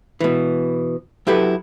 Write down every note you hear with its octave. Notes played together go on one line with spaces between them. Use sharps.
B2 E3
F#3 E4 G4 A4 B4